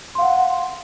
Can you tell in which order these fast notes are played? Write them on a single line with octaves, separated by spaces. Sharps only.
C6 F5 F#5